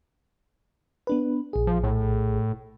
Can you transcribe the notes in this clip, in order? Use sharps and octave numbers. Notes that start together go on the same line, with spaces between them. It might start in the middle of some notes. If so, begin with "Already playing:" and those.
B3 D4 B4
A#1 G#4
F3
A2